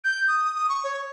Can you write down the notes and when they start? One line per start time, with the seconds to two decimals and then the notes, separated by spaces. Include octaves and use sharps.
0.04 G6
0.28 D#6
0.55 D#6
0.69 C#6
0.84 C#5